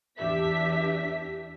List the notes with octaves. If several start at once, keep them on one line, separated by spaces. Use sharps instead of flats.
E2 D4 G4 E5 B6